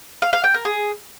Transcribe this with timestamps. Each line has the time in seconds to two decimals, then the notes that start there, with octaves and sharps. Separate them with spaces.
0.22 F5
0.33 F5
0.44 G5
0.54 A#4
0.65 G#4